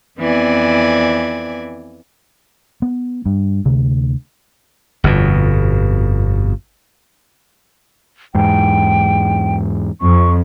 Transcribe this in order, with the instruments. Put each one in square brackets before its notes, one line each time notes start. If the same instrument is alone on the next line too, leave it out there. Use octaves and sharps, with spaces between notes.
[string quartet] F2 E3 B3 C4 D5 G#5
[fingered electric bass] B3
G2
D2 C3
[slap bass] G1 F2 B2
[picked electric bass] E2 G#2 [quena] G5
[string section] F2 [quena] C#6